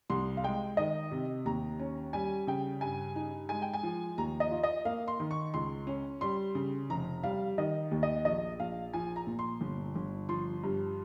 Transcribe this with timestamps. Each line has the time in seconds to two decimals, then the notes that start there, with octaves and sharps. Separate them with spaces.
0.10 C2 C6
0.37 F5
0.44 G#3 G5
0.77 D#3 D#5
1.11 C3
1.45 D#2 A#5
1.79 C#4
2.13 G3 G#5
2.47 C#3 G5
2.81 G2 G#5
3.16 D#4
3.49 G#3 G#5
3.62 G5
3.74 G#5
3.83 F3
4.18 D#2 A#5
4.40 D#5
4.51 F4
4.63 D#5
4.85 A#3 F5
5.08 C6
5.20 D#3
5.31 C#6
5.54 C#2 C6
5.87 C#4
6.21 G3 C6
6.55 C#3
6.90 F1 A#5
7.23 G3 F5
7.58 D#3 D#5
7.91 D#2
8.03 D#5
8.25 A#1 D#5
8.59 A#1 F5
8.93 F3 G#5
9.16 A#5
9.27 A#2
9.39 C6
9.61 G1
9.96 G1
10.29 F3 C6
10.63 G2